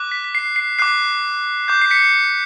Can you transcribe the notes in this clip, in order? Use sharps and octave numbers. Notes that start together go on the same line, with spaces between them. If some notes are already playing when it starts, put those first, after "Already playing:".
Already playing: D6 F#6
B6
B6
C7
C7
D6 F#6 C7
D6 G6
C7
B6 C#7